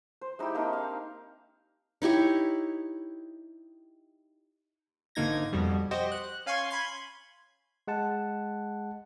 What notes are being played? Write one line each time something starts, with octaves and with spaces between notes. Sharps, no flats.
C5
G#3 D#4 E4 G4
A#3 C4 D4 D#4
F5
D#4 E4 G4 C#5
G#1 D3 A#3 D#4 G#6 A#6
F2 B2 G3
F#4 G4 C5 D#5
F#6
C#4 F5 G#5 C6 C#6
B5 C6 G#6
G#3 F#5 A5